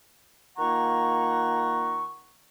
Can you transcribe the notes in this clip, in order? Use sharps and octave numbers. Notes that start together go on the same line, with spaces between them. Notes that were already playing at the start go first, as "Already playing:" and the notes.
D#3 A#3 F4 F#5 A#5 C#6